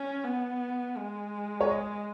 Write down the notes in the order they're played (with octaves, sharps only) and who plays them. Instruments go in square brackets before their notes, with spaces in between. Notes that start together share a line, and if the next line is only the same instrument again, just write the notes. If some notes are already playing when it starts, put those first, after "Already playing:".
Already playing: [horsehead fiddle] C#4
B3
G#3
[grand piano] C#5
D#5